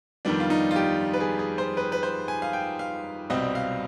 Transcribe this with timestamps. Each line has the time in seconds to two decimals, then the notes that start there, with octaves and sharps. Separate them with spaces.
0.25 F2 D#3 G3 B3 D4
0.40 F4
0.50 D#4
0.71 F4
0.76 G4
1.13 B4
1.20 G#4
1.39 G#4
1.58 C5
1.77 B4
1.92 B4
2.03 C5
2.28 G#5
2.42 F5
2.53 G5
2.79 F5
3.30 C2 B2 G3 C4 D#5
3.55 F5